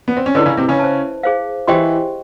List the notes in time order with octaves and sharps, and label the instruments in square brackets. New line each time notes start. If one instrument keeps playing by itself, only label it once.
[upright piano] B3
C4
C#4
[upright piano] D3 D4 [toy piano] E4 G#4 B4 D#5
[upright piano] C#3 C#4
C3 C4
C#3 C#4
[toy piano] C5 E5 A5
G#4 C5 F5
[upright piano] E3 E4 [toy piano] G4 C5 D#5 G5 C6